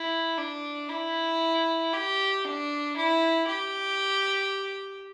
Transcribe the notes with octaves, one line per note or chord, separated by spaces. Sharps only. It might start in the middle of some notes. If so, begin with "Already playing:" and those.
Already playing: E4
D4
E4
G4
D4
E4
G4